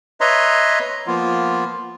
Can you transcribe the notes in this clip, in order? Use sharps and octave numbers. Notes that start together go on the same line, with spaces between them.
B4 C#5 D#5 E5 A#5 C6
F3 A#3 B3 F4